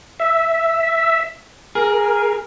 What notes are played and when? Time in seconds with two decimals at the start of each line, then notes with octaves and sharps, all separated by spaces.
0.20 E5
1.75 G#4 A#4